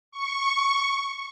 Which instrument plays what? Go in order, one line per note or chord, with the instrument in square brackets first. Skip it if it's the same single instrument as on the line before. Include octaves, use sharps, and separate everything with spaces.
[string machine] C#6